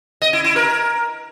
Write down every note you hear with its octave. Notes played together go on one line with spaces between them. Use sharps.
D#5
E4
E4
A#4